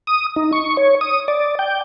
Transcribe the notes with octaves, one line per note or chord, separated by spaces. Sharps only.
D#6
D#4
C#6
C#5
D#6
D5
G5